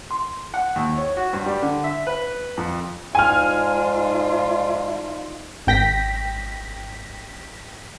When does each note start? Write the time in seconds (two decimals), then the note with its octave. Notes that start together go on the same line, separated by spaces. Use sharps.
0.11 C6
0.54 F#5
0.76 D#2
0.98 C#5
1.17 F#4
1.33 G2
1.46 G3
1.62 D3
1.84 E5
2.07 B4
2.57 F2
3.15 G#2 F3 D#4 F4 D5 G#5 F6
5.67 G#1 G5 A#6 B6